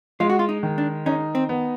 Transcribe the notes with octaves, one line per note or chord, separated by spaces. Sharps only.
G#3 F4
F#4
F4
D#4
D#3
D4
C#4 D#4
C4
B3